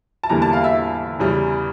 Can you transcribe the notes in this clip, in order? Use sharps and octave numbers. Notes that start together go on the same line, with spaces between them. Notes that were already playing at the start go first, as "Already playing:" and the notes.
A5
E2 D3 G3 A#3 A#5
A5
F5
E5
E2 C#3 G3